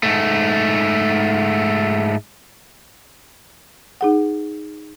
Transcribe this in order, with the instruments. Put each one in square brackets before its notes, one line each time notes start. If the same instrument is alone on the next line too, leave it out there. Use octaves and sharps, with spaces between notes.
[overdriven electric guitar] G#2 A3
[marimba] D#4 G#4 F#5